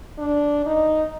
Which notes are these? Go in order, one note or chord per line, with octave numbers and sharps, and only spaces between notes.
D4
D#4